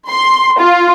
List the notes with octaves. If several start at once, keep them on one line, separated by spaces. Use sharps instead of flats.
C6
F4